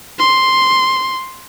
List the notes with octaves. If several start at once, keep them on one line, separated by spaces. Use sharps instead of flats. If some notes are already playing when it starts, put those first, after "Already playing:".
C6